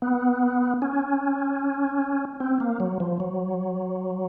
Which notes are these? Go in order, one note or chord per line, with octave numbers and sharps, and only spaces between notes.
B3
C#4
C4
A#3
F#3
F3
F#3